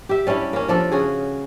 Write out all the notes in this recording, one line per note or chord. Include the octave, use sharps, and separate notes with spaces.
G4 E5
G3 C#4 D4 E4
A#3 C#4
F3 D4 A4 D5
C#3 C#4 F#4 G#4